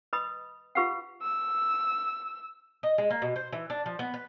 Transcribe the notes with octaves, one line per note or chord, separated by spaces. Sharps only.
B4 D#5 B5 D#6
F4 G4 B4 F5 F#5
E6
D#5
G#3
A#3
B2
C5
E3
D4
F3
B3
B4